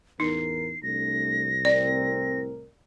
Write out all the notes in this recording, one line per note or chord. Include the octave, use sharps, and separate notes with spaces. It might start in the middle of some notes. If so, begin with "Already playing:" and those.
A1 E2 D#4 A#4 C7
C2 A3 D4 A#6
A2 C4 A#4 D5